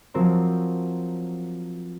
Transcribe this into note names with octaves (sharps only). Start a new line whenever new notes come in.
F3 F#3 C4 A#4 C5